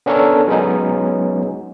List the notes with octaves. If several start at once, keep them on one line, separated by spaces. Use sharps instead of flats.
B3 C#4 D4 A4 A#4 C#5
F#3 G#3 B3 C#4 D#4